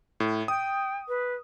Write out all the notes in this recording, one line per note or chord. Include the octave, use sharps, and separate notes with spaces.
A2
G5 D#6
B4